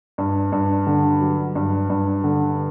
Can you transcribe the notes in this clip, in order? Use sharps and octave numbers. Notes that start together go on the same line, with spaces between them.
G2
G2
D3
F#3
G2
G2
D3